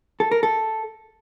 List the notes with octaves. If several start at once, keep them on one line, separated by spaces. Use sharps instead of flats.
A4
A#4
A4